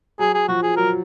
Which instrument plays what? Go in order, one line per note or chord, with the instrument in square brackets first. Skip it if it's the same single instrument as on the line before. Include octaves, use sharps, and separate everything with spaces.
[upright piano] F#3 [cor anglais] G#4
[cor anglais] G#4
[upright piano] F3 [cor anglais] F#4
[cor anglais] G#4
[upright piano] F#3 [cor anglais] A#4